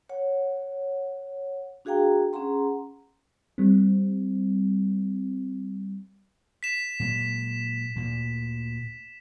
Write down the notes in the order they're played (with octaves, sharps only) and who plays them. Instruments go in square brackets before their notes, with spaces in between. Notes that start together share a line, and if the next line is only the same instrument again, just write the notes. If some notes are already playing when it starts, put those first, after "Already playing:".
[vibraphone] C#5 F#5
D4 F#4 G#4 F5 G5 A#5
C#4 G#4 F#5 A#5 C6
[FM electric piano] G3 C4
[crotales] B6 E7
[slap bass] A#2 F#3 G#3
D2 A#2